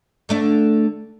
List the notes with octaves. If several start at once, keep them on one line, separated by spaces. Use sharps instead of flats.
D3 A3 D4